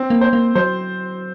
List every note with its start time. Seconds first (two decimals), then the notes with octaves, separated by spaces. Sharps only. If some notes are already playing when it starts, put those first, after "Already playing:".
Already playing: C4
0.10 A#3
0.21 C5
0.33 A#3
0.55 F#3 C5